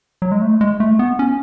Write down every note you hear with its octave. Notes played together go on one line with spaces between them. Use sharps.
F#3
G#3
A3
G#3
A3
B3
C#4